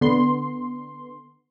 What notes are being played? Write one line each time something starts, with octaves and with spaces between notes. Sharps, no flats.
D3 B3 C6